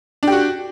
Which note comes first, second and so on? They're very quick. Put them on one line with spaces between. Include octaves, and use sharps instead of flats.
D4 G4 F#4